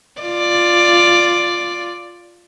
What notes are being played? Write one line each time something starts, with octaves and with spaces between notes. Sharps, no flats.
F4 D5